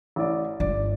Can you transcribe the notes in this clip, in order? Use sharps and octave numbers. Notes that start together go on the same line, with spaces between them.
A1 D5
G1 D5